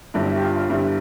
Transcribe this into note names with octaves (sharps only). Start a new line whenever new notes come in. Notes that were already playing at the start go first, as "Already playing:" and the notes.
G1 G2 D3 E4
E4
G4
F4
F4
G1 G2 D3 E4